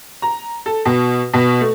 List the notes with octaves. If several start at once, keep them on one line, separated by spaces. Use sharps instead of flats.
A#5
A4
B2
B2
A3